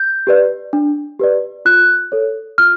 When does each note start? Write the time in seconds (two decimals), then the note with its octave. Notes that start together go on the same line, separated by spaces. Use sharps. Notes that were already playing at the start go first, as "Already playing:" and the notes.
Already playing: G6
0.27 G4 B4 D5
0.73 D4
1.20 G4 B4 D5
1.65 F4 F#6
2.12 A4 C#5
2.58 F4 F6